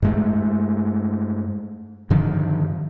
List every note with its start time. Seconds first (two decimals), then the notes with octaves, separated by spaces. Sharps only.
0.02 G2 G#3 A3
2.10 G2 D3 D#3 F3